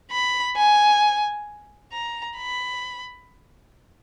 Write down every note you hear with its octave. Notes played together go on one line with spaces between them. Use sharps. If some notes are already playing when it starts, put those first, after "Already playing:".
B5
G#5
A#5
B5